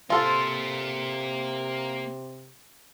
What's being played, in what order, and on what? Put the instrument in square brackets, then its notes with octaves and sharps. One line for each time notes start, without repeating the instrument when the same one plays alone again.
[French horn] C3 [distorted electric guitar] A#3 C6 [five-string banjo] F4 A4 C5